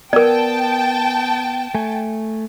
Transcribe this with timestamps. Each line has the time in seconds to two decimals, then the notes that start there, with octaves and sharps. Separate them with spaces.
0.13 B3 A#4 D5 G5 A5
1.75 A3 G#5